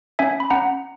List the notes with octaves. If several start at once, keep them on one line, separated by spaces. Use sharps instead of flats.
C#4 E5 G#5
B5
C#4 F#5 A#5